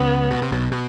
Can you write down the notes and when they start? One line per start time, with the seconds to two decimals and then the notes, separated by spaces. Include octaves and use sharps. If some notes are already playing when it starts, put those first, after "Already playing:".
Already playing: C#2 C#3 B3
0.31 B2
0.42 C3
0.52 B1 B2
0.72 B2